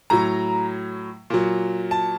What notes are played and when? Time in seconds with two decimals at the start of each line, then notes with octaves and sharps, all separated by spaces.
0.10 A2 F#3 A#5
1.30 A#2 F#3
1.91 A5